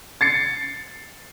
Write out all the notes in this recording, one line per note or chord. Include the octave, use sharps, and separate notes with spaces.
A6 C7 C#7